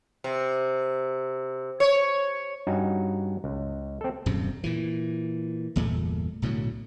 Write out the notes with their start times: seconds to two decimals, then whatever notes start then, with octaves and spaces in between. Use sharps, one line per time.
0.24 C3
1.80 C#5
2.67 G2 C#4 D#4 F#4
3.44 C#2
4.01 C4 A4
4.26 D#1 F#2 C3
4.64 A#2 E3
5.76 G1 E2 A#2 A3
6.42 B1 A2 D3 F#3